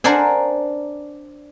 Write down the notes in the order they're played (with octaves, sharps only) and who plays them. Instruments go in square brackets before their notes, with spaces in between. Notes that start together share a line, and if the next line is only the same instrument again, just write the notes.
[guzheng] D4 A#4 C5 D5 F#5 G#5